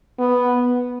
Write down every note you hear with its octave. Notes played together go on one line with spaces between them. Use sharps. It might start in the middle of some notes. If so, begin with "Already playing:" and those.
B3